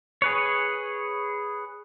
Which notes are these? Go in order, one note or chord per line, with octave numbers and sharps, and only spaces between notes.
G#4 B4 C#5